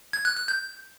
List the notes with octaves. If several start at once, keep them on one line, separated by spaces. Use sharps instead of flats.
G#6
F#6
F#6
G6